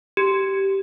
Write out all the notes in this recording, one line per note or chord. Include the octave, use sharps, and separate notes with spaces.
G4